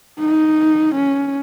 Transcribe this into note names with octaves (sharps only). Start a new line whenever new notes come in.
D#4
C#4